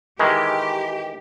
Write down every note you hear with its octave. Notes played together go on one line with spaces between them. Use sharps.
D#3 E3 G#3 G4